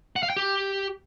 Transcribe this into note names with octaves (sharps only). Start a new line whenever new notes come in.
F#5
F5
G5
G4